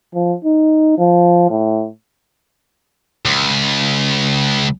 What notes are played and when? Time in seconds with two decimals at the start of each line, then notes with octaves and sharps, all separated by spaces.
0.14 F3
0.45 D#4
0.98 F3
1.50 A2
3.25 C#2